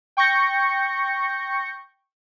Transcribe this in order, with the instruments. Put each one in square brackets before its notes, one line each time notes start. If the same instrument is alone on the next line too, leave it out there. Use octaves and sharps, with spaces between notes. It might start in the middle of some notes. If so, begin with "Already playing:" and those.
[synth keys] G5 C#6 G6 A#6 C#7